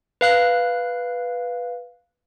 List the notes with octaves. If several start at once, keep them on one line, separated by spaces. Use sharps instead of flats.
B4 F5 F#6